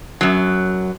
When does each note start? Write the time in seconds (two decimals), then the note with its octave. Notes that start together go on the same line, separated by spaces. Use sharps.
0.21 F#2 F#3